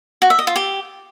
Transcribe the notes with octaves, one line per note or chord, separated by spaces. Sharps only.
F#4
E5
D#5
F4
G4